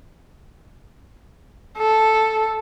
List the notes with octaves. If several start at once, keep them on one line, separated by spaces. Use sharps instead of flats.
A4